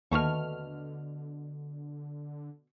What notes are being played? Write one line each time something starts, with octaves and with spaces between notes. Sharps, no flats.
D#2 B2 D3 A3 C#6 F6